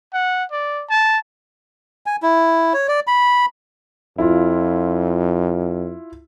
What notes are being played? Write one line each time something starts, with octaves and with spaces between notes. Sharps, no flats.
F#5
D5
A5
G#5
E4
C#5
D5
B5
F2 E4 F4